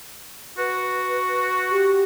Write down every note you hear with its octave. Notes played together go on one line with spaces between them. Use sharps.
F#4 B4
G4